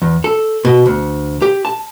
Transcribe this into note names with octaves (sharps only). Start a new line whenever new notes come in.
E2
A4
B2
D2
G4
A5